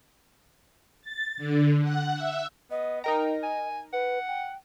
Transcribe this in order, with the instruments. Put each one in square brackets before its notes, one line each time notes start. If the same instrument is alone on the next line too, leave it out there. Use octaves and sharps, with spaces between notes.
[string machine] A6
D3
F#5
E5
[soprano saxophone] B3 [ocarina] D#5
[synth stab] D#4 A#4 A#5 [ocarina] D#5 [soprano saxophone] G5
[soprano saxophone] G#5
[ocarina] B4 [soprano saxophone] F#5
[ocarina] G5